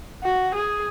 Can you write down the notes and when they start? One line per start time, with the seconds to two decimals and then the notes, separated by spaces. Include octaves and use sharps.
0.24 F#4
0.54 G#4